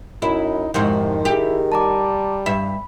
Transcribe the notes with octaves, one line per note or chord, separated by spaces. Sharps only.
F#2 D#4 E4
F2 G#2 C3 D#3 F#4
E4 G4 G#4 A#4
G3 A5 A#5 D6
G2 E5 B5